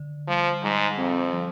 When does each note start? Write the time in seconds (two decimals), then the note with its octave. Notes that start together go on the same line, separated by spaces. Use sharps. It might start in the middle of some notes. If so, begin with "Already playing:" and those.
Already playing: D3
0.28 F3 G3
0.63 G#2 G3
0.97 F2 C4
1.32 F3